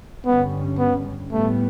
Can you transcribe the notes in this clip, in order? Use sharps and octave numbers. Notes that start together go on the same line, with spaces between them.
G2 D3 G3 B3 C#4
B3
A2 G3 A3 B3